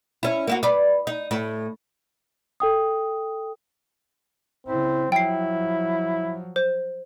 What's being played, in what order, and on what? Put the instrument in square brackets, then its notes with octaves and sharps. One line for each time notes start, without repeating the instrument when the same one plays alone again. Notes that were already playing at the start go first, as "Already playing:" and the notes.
[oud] C#4 E4
A#3 E4 F#4
B4 D5
D#4
A2
[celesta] A4 G5 D#6
[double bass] C#3 E4 [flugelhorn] C4
[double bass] F3 F#3 [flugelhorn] E4 [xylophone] G5 C7
[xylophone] C5